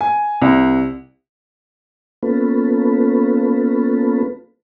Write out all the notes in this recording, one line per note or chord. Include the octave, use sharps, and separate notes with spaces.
G#5
C2
A#3 B3 C#4 F4 A4 B4